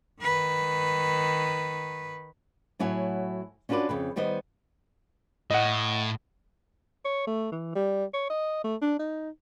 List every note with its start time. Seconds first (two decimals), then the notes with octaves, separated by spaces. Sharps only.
0.22 D#3 B4
2.79 A2 F#3 E4 F#4 C#5 G#5
3.69 C#4 D4 F4 F#4 B4 D5
3.89 F2 C#3 B4
4.16 D#3 G3 B3 C5 D#5
5.50 A2 D#5 F#5
7.05 C#5
7.27 A3
7.52 E3
7.75 G3
8.14 C#5
8.30 D#5
8.64 A3
8.82 D4
8.99 D#4